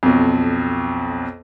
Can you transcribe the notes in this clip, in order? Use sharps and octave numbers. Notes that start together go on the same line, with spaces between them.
B1 F2